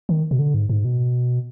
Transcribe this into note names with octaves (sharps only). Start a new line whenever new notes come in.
D#3
B2
D3
G#2
G#2
B2